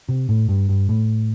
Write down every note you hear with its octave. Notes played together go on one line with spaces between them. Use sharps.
C3
A2
G2
G2
A2